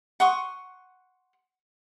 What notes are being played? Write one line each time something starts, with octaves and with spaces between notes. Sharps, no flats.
F#5 C6 C#6 D#6